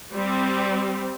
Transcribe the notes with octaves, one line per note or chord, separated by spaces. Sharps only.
G3 C4